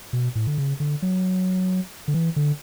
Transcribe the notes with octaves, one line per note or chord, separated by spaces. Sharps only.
B2
A2
D3
C#3
D3
F#3
D3
E3
D3